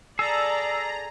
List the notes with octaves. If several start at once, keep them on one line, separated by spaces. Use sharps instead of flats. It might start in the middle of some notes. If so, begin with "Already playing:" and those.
G#4 A4 D5 A#5 E6